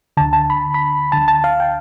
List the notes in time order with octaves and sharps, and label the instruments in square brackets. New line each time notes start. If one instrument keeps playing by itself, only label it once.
[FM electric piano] D2 D3 A5
A5
B5
B5
D2 D3 A5
A5
F5
G5